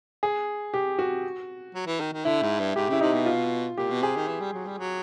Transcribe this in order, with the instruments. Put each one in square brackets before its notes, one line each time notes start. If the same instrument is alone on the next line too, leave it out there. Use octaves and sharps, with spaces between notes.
[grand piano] G#4
G4
F#4
[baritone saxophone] F#3
E3
D#3
D#3
[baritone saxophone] D3 [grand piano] E4
[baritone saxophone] G#2
G2
[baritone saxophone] G#2 [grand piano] G4
[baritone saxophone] C#3 [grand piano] E4
[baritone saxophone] C3 [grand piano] D#4
[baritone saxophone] B2
[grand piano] F4
[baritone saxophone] A#2 [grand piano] G4
[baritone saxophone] B2
[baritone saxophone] C3 [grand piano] G#4
[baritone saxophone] D#3
E3
G3
F#3
G3
F#3